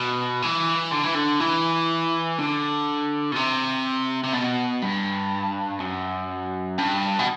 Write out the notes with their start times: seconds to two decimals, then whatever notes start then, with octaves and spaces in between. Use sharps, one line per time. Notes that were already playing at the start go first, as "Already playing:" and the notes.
Already playing: B2
0.42 E3
0.92 D3
1.04 E3
1.15 D3
1.40 E3
2.38 D3
3.32 B2
3.36 C3
4.24 C3
4.33 B2
4.82 G2
5.80 F#2
6.78 G2
7.19 B2